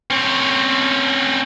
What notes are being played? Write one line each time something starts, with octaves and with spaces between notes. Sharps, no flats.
C4 C#4